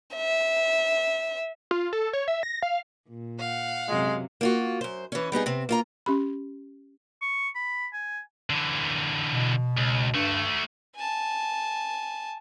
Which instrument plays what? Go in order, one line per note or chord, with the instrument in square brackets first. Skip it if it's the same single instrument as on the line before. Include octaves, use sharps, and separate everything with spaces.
[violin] E5
[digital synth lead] F4
A4
C#5
E5
A#6
F5
[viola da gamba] A#2
[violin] F5 F#5
[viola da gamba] F#2 C3 F#3 [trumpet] G#3
[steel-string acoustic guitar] A#3 F4 F#4
F#2 C5
E3 C#4
G3 B3 D#4 G#4
C3 C4
A#3 F4 A#5
[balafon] C#4 G4 B5
[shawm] C#6
B5
G#5
[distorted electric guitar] D3 E3
[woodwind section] B2
[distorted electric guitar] C#2
[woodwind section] G2 [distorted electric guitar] A3 F#4
[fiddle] G#5 A5